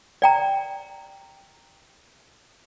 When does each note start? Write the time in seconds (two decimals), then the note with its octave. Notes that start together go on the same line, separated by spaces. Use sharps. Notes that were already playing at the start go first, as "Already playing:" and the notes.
0.22 D5 G5 A#5